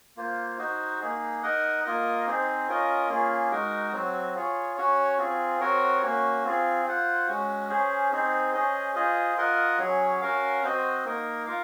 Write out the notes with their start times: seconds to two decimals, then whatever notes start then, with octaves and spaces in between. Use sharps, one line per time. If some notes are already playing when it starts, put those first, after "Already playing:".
0.17 A#3 F4 C5
0.58 D#4 F#4 C5
1.00 A#3 D#4 G#4
1.43 D#4 A#4 D#5 F#5
1.85 A#3 F4 A#4 D#5
2.26 C4 D#4 G#4 C5
2.68 C#4 F4 A#4 D#5
3.09 A#3 C#4 F4 G#4
3.51 G#3 D#4 F#4 A#4
3.93 F#3 C4 F#4
4.35 F4 G#4 C#5
4.76 C#4 F#4 C#5
5.18 C4 F4 G#4
5.60 C4 F#4 A#4 C#5
6.02 A#3 C#4 F#4
6.45 C4 F4 G#4
6.85 F4 C5 F#5
7.27 G#3 C#4 F#4
7.69 C#4 G#4 C5
8.12 C4 D#4 G#4 C5
8.53 C#4 G#4 C5 D#5
8.95 F4 G#4 C5 D#5
9.36 F4 A#4 D#5 F#5
9.78 F#3 C#4 G#4 C#5
10.21 C#4 F#4 A#4 F5
10.63 C4 F#4 C5 D#5
11.05 A#3 D#4 A#4
11.46 F4 A#4 F5